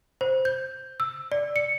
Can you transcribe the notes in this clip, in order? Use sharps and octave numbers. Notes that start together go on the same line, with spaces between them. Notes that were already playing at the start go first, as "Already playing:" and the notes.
C5
G6
E6
D5
C#7